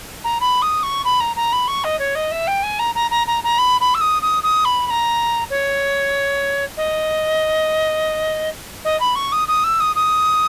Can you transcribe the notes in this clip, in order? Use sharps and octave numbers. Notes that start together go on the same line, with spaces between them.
A#5
B5
D#6
C#6
B5
A#5
A#5
B5
C#6
D#5
C#5
D#5
E5
G5
G#5
A#5
A#5
A#5
A#5
A#5
B5
B5
E6
D#6
D#6
D#6
B5
B5
A#5
C#5
D#5
D#5
B5
C#6
D#6
D#6
E6
D#6
D#6